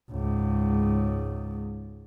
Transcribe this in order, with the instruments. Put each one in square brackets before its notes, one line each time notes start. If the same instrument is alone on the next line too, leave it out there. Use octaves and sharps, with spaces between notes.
[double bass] C#2 G#2